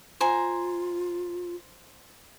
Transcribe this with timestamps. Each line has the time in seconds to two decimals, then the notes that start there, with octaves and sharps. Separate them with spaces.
0.21 F4 C5 G#5 A#5